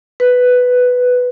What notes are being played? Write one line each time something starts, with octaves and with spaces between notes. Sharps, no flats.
B4